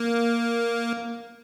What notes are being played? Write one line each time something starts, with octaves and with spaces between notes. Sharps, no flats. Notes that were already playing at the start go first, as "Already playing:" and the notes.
Already playing: A#3